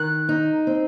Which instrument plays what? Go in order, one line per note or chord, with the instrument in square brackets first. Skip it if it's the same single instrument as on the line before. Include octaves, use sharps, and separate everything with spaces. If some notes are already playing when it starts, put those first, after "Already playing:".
Already playing: [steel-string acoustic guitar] D#3 [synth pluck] F#6
[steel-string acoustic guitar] D#4
C4